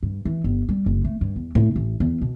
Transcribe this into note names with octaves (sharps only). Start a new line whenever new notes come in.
G2
E3
G1
G3
F#1
A3
G2
E2
A2
A1
E2
B2